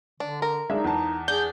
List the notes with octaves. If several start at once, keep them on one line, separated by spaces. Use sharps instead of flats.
D3 D4
A#4
G#3 D4 D#4 E5
E2 A5
D4 G#4 G6